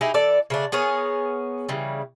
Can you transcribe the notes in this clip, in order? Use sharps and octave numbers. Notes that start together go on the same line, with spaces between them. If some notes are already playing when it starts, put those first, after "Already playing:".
D#4 E4 G4 G#4
E3 A4 D5
C#3 A3 D4
B3 G#4 A#4 C#5
C#3 E3 G3